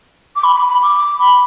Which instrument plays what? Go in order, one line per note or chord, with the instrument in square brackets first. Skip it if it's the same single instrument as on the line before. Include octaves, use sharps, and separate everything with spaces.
[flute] D6
B5
B5
B5
D6
B5